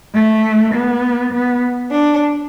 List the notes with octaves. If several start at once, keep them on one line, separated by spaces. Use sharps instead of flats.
A3
B3
B3
D4